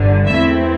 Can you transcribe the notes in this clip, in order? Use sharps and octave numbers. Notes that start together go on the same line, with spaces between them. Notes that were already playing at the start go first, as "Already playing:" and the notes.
Already playing: G1 G2 D3
E2 E3 A3 C4 E4 E5